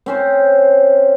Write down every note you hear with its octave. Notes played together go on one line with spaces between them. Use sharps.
C4 C#4 C5